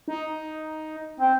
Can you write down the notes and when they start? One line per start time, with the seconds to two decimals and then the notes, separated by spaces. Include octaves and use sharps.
0.08 D#4
1.20 C4